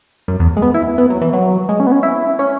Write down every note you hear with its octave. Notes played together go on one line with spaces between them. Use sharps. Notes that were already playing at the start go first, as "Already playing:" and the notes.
F#2
E2
G#3
B3
E4
B3
F#3
E3
F#3
G#3
C#4
B3
C#4
E4
C#4